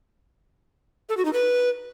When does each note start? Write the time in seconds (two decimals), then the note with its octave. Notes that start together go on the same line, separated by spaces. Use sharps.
1.09 A4
1.17 F#4
1.25 D#4
1.33 B4